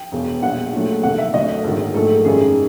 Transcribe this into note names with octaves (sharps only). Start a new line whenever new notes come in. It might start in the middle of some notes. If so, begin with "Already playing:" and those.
Already playing: G5
E1 E2 B2
A#1 A#2 G3 F#5
A#1 A#2 F#3 A3
F2 C3 D#3 F#5
E5
D2 D3 F#3 D#5
A#1 G#2 D#3 F#3
A#1 G#2 F3 A3 A4
G#1 F#2 D#3 G3 G#4